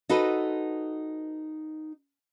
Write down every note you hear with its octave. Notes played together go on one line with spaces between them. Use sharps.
D#4 F#4 A4 B4 C5 D#5